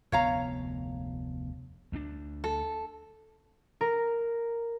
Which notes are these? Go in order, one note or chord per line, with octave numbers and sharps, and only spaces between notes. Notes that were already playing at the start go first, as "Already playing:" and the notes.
F1 D2 B3 C#5 F5 A#5
D2 G#3 D4
A4
A#4